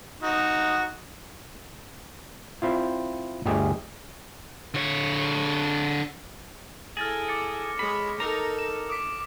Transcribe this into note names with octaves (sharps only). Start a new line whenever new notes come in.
D#4 F#4
C4 E4 F4
G1 D2 G4 G#4 D#5 G#5
D3 C#5
E4 G#4 A4 F6 A6 A#6
D6 A6 C#7
G#3 C#5 B5
D#4 A4 A#4 A#5
E7
D6 D#6 B6